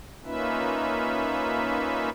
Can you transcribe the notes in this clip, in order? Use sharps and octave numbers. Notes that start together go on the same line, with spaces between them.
A#3 C#4 D#4 F4 B4 E5